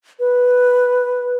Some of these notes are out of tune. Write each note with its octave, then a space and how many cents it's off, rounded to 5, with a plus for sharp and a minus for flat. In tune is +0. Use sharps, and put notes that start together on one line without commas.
B4 +0